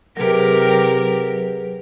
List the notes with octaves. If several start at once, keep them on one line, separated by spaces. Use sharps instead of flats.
C3 F#3 G4 G#4 A#4 B4